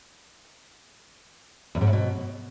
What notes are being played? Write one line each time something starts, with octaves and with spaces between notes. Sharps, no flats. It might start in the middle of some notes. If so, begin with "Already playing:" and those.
E2
G#2
A2
B2